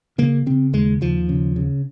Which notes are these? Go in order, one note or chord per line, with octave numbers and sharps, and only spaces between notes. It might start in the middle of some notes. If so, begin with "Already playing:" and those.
C#3 A#3
C#3 C4
D#2 G#3
D#2 F3
C#3
C#3